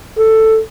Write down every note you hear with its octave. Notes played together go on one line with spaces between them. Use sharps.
A4